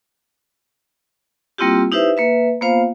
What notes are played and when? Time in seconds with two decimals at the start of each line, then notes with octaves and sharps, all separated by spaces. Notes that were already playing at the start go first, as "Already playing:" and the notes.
1.58 G3 A#3 C4 E4 F4 G4
1.92 D#4 E4 G4 B4 C5 E5
2.17 A#3 B4 E5
2.61 A#3 B3 F4 C5 F5